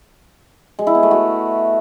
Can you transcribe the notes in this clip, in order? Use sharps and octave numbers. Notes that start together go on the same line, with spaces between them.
G#3
E4
B3
A3
F#4